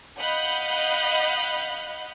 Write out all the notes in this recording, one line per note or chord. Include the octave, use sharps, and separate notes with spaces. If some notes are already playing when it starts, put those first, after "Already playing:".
D#5 F5 F#5 B5 F#6 G6